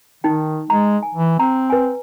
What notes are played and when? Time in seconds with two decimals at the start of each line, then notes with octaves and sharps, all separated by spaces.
0.24 D#3 D#4 G5
0.70 G#3 A#5
1.03 G#5
1.15 E3
1.39 C4 A#5
1.70 B4 G#5